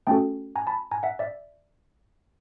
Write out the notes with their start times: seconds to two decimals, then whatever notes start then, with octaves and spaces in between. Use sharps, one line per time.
0.07 A3 C#4 F#4 A4 G5 A5
0.56 G#5 A#5
0.67 A5 B5
0.91 G#5 A#5
1.03 E5 F#5
1.19 D5 E5